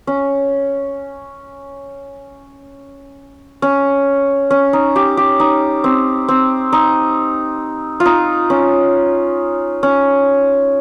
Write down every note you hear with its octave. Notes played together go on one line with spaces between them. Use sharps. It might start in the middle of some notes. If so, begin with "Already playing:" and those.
C#4
C#4
C#4
D#4
G4
G4
D#4
C4
C4
D#4
F4
D#4
C#4
C#4